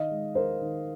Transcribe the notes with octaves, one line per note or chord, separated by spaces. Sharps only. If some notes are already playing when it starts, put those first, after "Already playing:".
Already playing: D#3 D#5 F5
G#3
D#3 A#4 C5
D#3